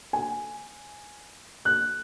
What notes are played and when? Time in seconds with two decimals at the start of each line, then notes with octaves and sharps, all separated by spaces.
0.13 G#5
1.65 F#6